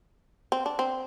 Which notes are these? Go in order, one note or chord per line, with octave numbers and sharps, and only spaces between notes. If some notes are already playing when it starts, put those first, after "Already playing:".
C4
D4
C4